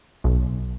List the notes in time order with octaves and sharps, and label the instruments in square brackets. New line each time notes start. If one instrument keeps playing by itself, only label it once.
[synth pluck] B1